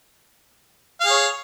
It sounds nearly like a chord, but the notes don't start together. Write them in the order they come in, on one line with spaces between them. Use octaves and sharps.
F5 G#4 C#5